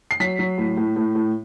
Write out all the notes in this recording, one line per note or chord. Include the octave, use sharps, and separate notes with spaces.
C7
F#3 B6
F#3
A2
A2
A2
A2